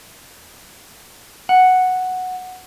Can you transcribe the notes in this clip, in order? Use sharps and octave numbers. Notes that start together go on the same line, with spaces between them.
F#5